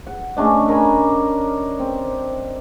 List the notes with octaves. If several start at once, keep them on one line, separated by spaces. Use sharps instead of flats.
F#5
A3 C#4 D4 D#5
A#4 G#5 B5
C4